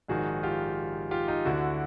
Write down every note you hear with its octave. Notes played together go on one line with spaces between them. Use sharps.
A#1 G#2 D#3 F#4 G#4
F4 G4
F4 G4
D#4 F4
D2 D3 E4 F#4